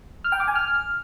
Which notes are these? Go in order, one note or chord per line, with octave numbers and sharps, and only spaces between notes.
F6
G5
D6
G#5
F6